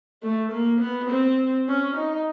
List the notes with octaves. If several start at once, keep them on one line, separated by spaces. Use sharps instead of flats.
A3
A#3
B3
C4
C#4
D#4